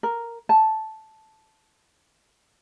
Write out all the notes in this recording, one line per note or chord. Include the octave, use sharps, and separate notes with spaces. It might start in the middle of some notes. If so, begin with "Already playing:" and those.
A#4
A5